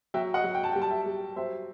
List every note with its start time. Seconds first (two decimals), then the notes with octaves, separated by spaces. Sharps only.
0.14 F#3 E5 G5
0.34 D#5 F#5
0.44 F#3
0.54 G5
0.64 A5
0.72 G3 G5
0.82 A5
0.90 E5 G5
1.06 G3
1.36 F#3 C5 E5